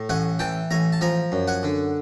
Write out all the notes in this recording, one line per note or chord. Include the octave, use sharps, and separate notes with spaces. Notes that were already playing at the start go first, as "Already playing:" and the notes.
Already playing: A2
A1 F#5 G#5
E3 G5 A5
A1 G#5 A#5
A5
F3 G#5 A#5
F#2
F#5 G#5
D3